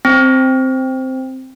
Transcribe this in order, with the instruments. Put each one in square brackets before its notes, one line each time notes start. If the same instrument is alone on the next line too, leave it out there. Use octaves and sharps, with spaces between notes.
[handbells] C4